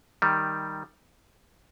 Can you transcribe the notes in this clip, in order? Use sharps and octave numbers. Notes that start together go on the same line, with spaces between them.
D#3 G3